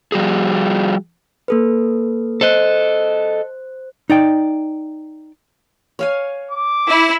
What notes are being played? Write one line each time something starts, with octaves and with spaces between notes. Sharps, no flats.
F3 G3 F#4 G#4
A#3 A4 B4
A4 C5 D#5 F#6
D#4 D5 G5
C#5 F5 G#5
D6
E4